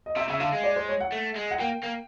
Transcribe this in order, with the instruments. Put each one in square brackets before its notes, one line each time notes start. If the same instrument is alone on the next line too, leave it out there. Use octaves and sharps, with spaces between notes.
[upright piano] D#5
[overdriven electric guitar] C3 [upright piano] E5
[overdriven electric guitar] C#3 [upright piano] E5
[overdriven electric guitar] D3 [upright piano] F5
[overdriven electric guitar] G#3
[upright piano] D5
C5
C#5
F#5
[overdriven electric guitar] A3
G#3
[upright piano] F#5
[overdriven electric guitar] A#3 [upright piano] G5
[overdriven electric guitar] A#3